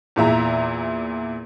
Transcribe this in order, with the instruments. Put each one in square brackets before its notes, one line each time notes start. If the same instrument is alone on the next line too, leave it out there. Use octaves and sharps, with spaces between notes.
[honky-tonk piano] E2 A#2 E5 A#5